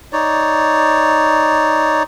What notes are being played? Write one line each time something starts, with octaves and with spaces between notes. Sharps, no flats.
D#4 C#5 D5